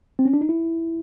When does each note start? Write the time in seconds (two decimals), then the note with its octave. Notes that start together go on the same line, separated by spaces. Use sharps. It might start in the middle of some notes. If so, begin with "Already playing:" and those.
0.19 C4
0.25 C#4
0.33 D4
0.41 D#4
0.49 E4